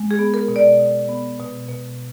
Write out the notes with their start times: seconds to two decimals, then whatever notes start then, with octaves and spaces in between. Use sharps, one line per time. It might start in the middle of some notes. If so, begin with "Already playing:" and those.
Already playing: G#3
0.11 G#4
0.19 B3
0.34 A#4
0.48 B2
0.56 D5
0.79 B2
1.09 B3
1.39 B2
1.69 B2